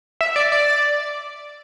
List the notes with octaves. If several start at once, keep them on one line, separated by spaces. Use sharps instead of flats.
E5
D5
D5